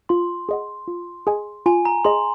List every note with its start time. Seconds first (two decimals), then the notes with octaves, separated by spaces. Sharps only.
0.09 F4 C6
0.49 G#4 D#5 F#5
0.88 F4
1.27 G#4 D#5 G#5
1.66 F4 G#5
1.85 A#5
2.05 G#4 D#5 G#5 C6